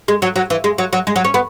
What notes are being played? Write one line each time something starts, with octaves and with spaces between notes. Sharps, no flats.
G#3
F#3
F#3
E3
G#3
F#3
F#3
G#3
F#3
C#4
B3